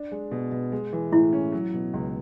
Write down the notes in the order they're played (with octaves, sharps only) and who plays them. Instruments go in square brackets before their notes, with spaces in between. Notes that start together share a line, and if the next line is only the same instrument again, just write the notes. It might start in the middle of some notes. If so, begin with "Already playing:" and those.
Already playing: [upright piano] D4
G#3
B2
B2
G#3
E3
[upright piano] A2 [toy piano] E4
[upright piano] C#4
F#3
B2
C#2